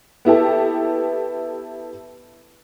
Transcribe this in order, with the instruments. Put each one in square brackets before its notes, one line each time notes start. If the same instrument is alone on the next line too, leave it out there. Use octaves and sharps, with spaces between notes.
[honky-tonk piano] B3 E4 G4 A4